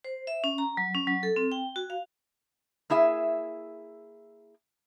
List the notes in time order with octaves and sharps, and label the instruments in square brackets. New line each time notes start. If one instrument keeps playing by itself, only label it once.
[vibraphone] C5
E5
C#4
A#5
F#3
C#4
F#3
A4
C4
G5
F#4
F5
[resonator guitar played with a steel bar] A#3 E4 G#4 E5